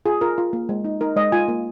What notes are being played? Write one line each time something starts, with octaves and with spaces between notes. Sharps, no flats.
F4 G#4
F4 A#4
F4
A#3
G#3
D#4
D#4 A#4
G#3 D#5
F4 G#5
A#3